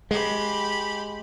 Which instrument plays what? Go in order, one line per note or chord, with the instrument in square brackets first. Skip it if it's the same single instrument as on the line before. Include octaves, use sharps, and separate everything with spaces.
[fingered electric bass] G#3 [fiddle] G4 B5